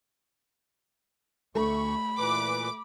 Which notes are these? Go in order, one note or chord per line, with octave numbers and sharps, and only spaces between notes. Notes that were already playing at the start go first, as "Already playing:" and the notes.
D2 A3 B5 C#6
A#2 E3 B4 D6